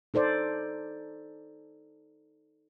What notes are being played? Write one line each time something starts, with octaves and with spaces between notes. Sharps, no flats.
D#4 A4 C5 D5